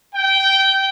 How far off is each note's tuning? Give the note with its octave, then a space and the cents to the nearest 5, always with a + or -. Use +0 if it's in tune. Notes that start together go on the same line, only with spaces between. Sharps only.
G5 -15